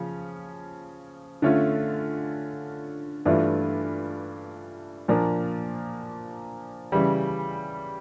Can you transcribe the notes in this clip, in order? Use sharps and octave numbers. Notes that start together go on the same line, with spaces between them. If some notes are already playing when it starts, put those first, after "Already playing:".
Already playing: C#3 F3 C#4
D3 A3 C#4 F4
G2 E3 A3 D4 F4
A#2 F3 A#3 D4
C#3 E3 G3